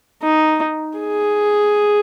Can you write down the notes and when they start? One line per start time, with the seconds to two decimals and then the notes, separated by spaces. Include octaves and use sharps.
0.23 D#4
0.99 G#4